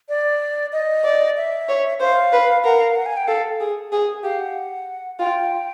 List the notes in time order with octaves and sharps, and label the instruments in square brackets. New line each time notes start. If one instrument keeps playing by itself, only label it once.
[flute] D5
D#5
[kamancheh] D5
[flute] E5
[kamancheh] C#5
[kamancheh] C5 [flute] F5
[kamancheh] B4
[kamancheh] A#4 [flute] F#5
[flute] F5
F#5
G#5
G5
[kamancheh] A4 [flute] F5
[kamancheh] G#4
G#4
[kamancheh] G4 [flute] F5
[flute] F#5
[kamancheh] F4 [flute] G5